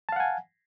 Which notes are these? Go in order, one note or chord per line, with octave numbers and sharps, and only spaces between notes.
F5 F#5 G#5 A5